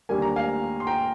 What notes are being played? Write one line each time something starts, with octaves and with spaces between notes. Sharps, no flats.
D#2 D3 G3 A#3 G#5
A#5
F5 G#5
C6
G5 A#5